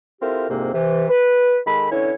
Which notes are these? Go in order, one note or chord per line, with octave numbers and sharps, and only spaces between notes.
C4 E4 F4 G4 A4 A#4
C2 F2 G#2 C3 A#3 C4
C3 E3
B4
D#3 G#3 A4 B5
D3 E3 C#4 E4 C#5